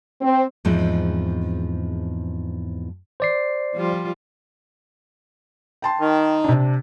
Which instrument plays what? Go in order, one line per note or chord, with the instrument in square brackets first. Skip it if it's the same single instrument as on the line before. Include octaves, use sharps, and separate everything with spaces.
[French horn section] C4
[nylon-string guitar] E2 G#2 F3 G#3 C4
[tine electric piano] C5 D5 C7
[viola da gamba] F3 G3 F4
[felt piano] G5 A5 C6
[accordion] D#3
[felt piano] C3 D4